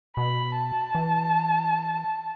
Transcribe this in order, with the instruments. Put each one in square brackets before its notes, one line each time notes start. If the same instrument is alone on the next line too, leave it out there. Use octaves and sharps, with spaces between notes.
[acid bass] B2 [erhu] B5
[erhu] A5
[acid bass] E3